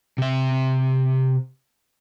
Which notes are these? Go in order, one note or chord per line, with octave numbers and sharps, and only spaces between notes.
C3 E5